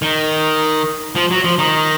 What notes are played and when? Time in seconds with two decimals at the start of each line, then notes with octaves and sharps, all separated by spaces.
0.02 D#3
1.15 F3
1.31 F#3
1.44 F3
1.58 D#3